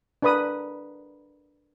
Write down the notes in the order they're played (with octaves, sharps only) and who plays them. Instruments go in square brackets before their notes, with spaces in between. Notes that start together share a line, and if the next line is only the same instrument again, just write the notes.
[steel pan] D4 A#4 B4 B5 D#6